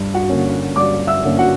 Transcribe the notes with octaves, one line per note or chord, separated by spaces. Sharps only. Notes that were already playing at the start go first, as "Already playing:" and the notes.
Already playing: G2
F#4 F#5
D3 A#3 C#4
G2 D5 D6
E5 E6
D3 A#3 C#4
F#4 F#5